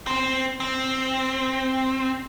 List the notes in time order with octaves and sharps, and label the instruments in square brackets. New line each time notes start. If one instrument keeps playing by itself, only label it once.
[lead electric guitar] C4
C4